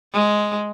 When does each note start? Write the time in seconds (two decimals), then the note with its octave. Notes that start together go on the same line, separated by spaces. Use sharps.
0.13 G#3